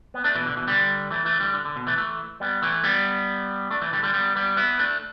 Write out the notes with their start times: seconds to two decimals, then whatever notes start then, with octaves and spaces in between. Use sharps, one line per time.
0.14 B3
0.24 A3 D4
0.35 B2 E3
0.46 D3
0.56 B2 E3
0.67 D3 G3
1.11 E3 A3
1.25 E3 A3
1.40 D3 G3
1.54 D3
1.65 D3
1.76 B2
1.87 E3 A3
1.97 E3 A3
2.40 G3 B3
2.62 E3 A3
2.84 G3 B3
3.70 A3 D4
3.81 E3 A3
3.92 D3 G3
4.03 D3 G3
4.14 G3 B3
4.35 G3 B3
4.57 B3 E4
4.79 A3 D4